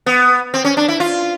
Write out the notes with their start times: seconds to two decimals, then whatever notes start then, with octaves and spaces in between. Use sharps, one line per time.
0.06 B3
0.54 C4
0.65 C#4
0.77 D4
0.88 E4
1.00 F4